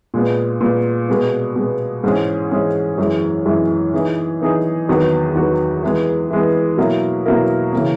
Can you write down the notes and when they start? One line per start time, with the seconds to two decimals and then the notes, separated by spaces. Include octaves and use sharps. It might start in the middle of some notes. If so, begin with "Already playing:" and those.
0.14 A#2 G#3 B3
0.61 A#2 G#3 B3
1.09 B2 G#3 B3
1.56 B2 G#3 B3
2.04 G#2 E3 G#3 C#4 G#4
2.51 G#2 E3 G#3 C#4 G#4
2.98 F#2 E3 G#3
3.46 F#2 E3 G#3
3.94 E3 B3 D#4 G#4
4.41 E3 B3 D#4 G#4
4.89 E2 D#3 F#3 B3 F#4
5.35 E2 D#3 F#3 B3 F#4
5.83 E3 G#3 B3
6.30 E3 G#3 B3
6.78 B2 F#3 A#3 E4 A#4
7.26 B2 F#3 A#3 E4 A#4
7.73 C#3 E3 A#3